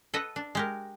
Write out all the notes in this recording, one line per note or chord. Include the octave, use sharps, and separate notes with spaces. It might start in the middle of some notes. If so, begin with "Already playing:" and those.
A4 B4 D#5 F#5
D4
G#3 G4 A#4